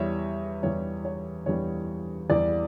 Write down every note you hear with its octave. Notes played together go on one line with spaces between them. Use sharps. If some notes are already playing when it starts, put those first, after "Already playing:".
Already playing: E2 E3 G3 C#5 E5
E2 E3 G3 C#5
C#5
E2 E3 G3 C#5
E2 E3 G3 D5